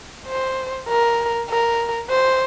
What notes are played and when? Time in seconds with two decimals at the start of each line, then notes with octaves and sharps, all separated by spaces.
0.28 C5
0.89 A#4
1.50 A#4
2.10 C5